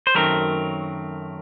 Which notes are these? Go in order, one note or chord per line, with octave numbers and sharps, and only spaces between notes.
C5
F#2 D#3 F#3 A3 C4 A#4